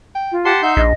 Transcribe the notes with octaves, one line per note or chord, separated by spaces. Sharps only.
G5
F4
G4 F#5 A5 C6
D#4 E5 F#5 G6
A#1 D#5